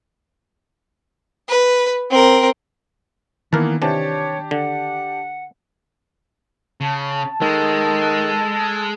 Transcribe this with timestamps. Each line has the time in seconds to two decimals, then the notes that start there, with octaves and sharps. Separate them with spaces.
1.49 B4
2.10 C4 A#4
3.53 D#3 E3 A#3 B3 A#4 A5
3.82 C3 E3 D4 G4 C#5 A5
4.51 D3 F#5
6.81 C#3 A5
7.41 D#3 G#3 A4